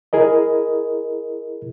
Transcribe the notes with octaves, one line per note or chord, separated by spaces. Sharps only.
E4 G#4 A#4 D#5